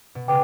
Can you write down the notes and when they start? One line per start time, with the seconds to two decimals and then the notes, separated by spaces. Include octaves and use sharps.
0.15 B2
0.28 C#3 B4 G5 D6